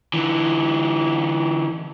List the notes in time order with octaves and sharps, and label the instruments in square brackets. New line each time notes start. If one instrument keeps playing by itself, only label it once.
[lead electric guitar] D3 E3